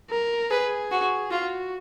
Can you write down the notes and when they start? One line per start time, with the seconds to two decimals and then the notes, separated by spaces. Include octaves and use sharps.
0.10 A#4
0.50 G#4 B4
0.91 F#4
1.31 F4 F#4